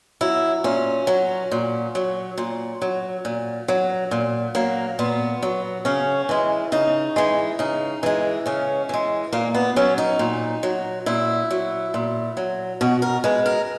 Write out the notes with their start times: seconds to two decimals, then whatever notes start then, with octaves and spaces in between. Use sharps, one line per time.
0.21 F#3 E4
0.64 A#2 C#4
1.07 F#3
1.52 A#2
1.95 F#3
2.38 A#2
2.82 F#3
3.25 A#2
3.68 F#3
4.11 A#2
4.55 F#3 A#3
4.99 A#2 B3
5.42 F#3
5.85 C#3 C#4
6.29 E3 G#3
6.72 C#3 D#4
7.16 E3 G#3
7.59 C#3 D#4
8.03 E3 G#3
8.46 C#3 C#4
8.89 E3 G#3
9.32 A#2 A#3
9.55 B3
9.76 F#3 C#4
9.98 D#4
10.19 A#2
10.63 F#3
11.06 A#2 E4
11.51 F#3
11.94 A#2
12.37 F#3
12.81 B2 F#4
13.02 A#4
13.24 G#3 B4
13.46 A#4